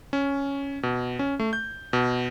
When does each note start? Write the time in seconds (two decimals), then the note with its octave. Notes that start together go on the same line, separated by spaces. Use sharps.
0.13 C#4
0.83 B2
1.19 C#4
1.40 A3
1.53 G6
1.93 B2